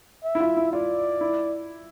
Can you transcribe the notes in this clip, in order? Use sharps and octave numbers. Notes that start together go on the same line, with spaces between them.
E5
E4
F4
E4
F4 D5
E4